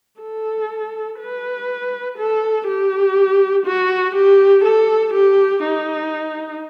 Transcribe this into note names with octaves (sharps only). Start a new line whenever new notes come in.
A4
B4
A4
G4
F#4
G4
A4
G4
D#4